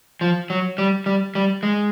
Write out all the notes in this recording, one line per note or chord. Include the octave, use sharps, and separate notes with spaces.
F3
F#3
G3
G3
G3
G#3